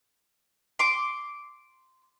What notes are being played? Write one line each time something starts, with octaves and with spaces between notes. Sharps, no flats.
C6 D6